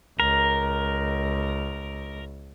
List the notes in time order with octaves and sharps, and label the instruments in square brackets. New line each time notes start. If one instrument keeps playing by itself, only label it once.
[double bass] C#2 [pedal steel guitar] A#4